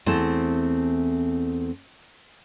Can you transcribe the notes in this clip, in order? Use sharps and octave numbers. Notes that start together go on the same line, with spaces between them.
E2 A3 C4 E4 C5 A5